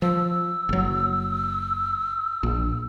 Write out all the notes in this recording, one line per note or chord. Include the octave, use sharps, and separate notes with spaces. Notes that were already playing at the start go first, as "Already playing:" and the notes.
F3 E6
F#1 F#3
A#1